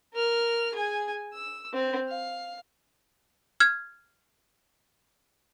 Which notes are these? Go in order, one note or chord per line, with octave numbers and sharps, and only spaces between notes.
A#4 F6
G#4 G#5
E6
C4
F5
F6 G#6